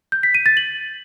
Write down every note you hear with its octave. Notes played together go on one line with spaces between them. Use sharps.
G6
B6
D#7
A6
F#7